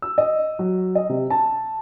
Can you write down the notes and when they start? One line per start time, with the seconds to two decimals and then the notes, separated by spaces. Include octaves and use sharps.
0.02 E6
0.18 D#5
0.59 F#3
0.95 D#5
1.09 C3
1.30 A5